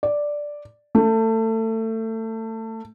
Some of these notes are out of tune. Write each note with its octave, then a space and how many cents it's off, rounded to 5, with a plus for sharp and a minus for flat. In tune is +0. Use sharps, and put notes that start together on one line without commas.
D5 +0
A3 +25